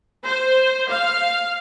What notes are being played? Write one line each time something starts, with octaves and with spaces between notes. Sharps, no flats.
C5
F5